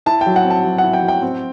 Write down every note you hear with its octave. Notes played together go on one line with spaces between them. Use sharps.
E4 A5
G5
F#3
F#5
C4
A5
F#3
E4 F#5
G5
F#3
G5
C4